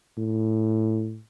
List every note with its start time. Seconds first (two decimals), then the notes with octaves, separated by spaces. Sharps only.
0.18 A2